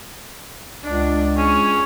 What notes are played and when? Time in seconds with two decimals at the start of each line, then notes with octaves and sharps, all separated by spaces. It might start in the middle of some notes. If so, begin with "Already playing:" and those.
0.84 C#2 D4
1.38 C#4 G#4